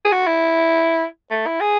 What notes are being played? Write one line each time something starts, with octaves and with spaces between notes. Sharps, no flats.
G#4
F#4
E4
A3
E4
G#4